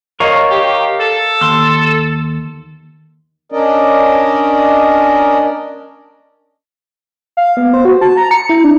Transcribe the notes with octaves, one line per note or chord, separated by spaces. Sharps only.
A#4 C#5 D#5 F5 A#5 C#6
D#3 G4
A4
D#2 C6 E6
C#4 D4 A#4 D5 D#5
F5
B3
C5
F#4
A5
A#5
C#7
E4
D4